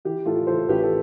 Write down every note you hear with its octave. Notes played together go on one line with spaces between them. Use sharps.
E3 G4
A2 F4 A4
E3 A4 C5
A1 G4 B4
A4